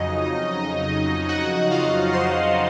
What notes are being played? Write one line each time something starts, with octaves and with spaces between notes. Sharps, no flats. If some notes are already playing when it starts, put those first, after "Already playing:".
Already playing: F2 C#3 F#3 D#4 D#5
F#4 F#5
F4 F5
C5 C6